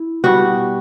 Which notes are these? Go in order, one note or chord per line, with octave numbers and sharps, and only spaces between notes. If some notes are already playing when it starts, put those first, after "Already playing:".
Already playing: E4
B2 G3 F#4